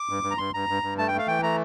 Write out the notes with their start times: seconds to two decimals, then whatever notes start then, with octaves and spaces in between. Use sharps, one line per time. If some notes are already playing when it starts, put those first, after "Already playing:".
Already playing: D6
0.09 G2
0.23 G2
0.31 A#5
0.38 G2 C6
0.54 G2 A#5
0.69 G2
0.83 G2
0.98 A3 A5
1.08 G5
1.14 A3 F5
1.28 E3 G5
1.42 A3 A#5